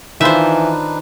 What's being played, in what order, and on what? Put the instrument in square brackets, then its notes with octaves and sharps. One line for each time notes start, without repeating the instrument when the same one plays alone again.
[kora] D#3 F4 [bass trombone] E3 [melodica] D4 D#4 B4 [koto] C5 E5